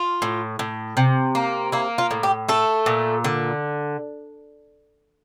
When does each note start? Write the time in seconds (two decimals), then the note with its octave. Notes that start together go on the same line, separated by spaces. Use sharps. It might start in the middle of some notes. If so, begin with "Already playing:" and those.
Already playing: F4
0.22 A2
0.59 A2
0.97 C3
1.35 A#3
1.72 A#3 E4
1.98 F4
2.11 A2
2.23 G4
2.48 A3 A4
2.86 A#2
3.24 D3